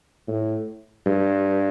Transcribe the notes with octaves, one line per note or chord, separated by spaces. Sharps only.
A2
G2